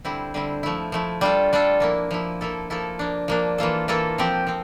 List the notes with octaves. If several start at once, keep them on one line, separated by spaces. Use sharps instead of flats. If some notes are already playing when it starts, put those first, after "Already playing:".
D3 G3 C4 E4
D3 G3 C4 E4
F3 A3 E4
F3 A3 E4
G3 D4 F4 A4
G3 D4 F4 A4
F3 A#3 E4
F3 A#3 E4
F3 A#3 E4 A4
F3 A#3 E4 A4
F3 A#3 D4
F3 A#3 D4
E3 A#3 F4 A4
E3 A#3 F4 A4
F3 C4 G4
F3 C4